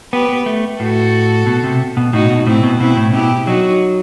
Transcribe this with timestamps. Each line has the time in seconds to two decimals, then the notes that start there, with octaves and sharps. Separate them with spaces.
0.13 B3 G4 B4
0.29 B3
0.46 A3
0.80 A2 F#4 A4
1.47 B2
1.64 C3
1.97 B2
2.13 A2 D#4 F#4
2.30 B2
2.47 A2 C4 E4
2.63 B2
2.80 B2 C4 E4
2.97 A2
3.13 B2 E4 G4
3.47 F#3 D#4 F#4